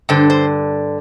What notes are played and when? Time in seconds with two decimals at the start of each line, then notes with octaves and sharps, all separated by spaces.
0.09 G2 D3 C5
0.30 C5